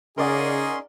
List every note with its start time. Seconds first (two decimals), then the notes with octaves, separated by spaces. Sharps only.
0.18 C#3 C#4 D#4 G#4 A#4 D5 F#5 C6